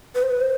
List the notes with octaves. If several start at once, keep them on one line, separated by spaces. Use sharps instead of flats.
B4
C5
B4
C5